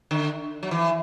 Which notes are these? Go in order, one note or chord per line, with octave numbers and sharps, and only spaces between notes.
D3
F#3
E3